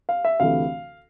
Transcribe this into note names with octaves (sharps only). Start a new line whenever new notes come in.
F5
E5
D2 C3 E3 A3 F5